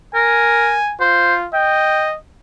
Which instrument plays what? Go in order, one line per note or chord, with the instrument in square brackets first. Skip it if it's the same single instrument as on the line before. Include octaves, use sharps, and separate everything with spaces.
[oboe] A#4 [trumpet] G#5
[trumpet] F4 [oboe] C5
[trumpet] D#5 [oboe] G5